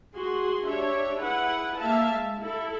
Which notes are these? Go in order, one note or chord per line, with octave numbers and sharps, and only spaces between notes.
F#4 G#4 C6
D4 G4 C#5 E5
E4 G#4 B4 F#5
A#3 E5 F5 A5
G#3
E4 A4